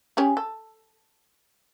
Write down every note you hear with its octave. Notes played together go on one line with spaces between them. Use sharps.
C#4 G4 G#4
A4